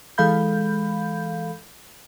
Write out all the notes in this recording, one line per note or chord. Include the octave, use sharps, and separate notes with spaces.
E3 G#3 A4 F5 B5 G6